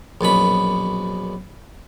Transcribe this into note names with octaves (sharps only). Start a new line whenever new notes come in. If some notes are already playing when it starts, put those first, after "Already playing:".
A#1 F#2 B2 B5